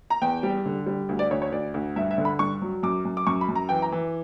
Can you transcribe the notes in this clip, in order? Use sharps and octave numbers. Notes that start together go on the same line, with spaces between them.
A#5
E2 G5
G3
D3
G3
D2
D5
D2 C#5
C#5
D2 D5
D2
G2 E5
E5
D3
B5
G2 C#6
F#3
F#2 D6
F#2
D6
F#2 C#6
B5
F#2
A#5
E3 G5
A#5
E3